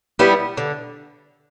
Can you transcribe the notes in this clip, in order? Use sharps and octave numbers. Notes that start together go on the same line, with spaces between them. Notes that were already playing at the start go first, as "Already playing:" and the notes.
G3 B3 E4
D3